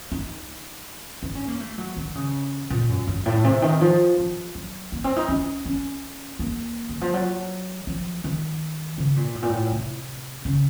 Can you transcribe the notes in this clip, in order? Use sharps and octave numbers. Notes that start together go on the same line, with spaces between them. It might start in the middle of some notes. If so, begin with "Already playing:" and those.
D#4
D#4
C#4
A#3
A3
F#3
D#3
C#3
A#2
F#2
F#2
A2
C3
D#3
F3
F3
F#3
A#3
C4
D#4
C#4
C#4
A#3
D#3
F3
F#3
F3
D#3
C#3
A#2
A2
A#2
A2
C3
C#3